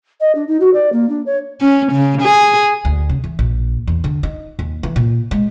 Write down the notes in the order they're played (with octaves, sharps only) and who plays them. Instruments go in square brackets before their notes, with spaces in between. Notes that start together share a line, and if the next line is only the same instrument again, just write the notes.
[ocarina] D#5
D4
D#4
F#4
D5
A#3
D4
C#5
[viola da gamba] C#4
C#3
G#4
[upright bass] D2
C#3
E3
A#1
E2
D3
D#4
D#2
E3
A#2
G#3